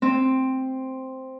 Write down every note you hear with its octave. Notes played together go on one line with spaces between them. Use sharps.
C4